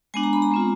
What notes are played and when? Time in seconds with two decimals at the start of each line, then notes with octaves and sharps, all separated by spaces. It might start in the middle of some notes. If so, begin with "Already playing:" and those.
0.14 G#3 B3 D4 G#5
0.23 A#5
0.33 B5
0.42 A#5
0.52 G#3 C4 F4